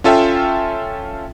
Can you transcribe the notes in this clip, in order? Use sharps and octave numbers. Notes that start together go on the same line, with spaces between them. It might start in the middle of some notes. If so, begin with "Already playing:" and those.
C#4 F4 A4 E5 F5 G5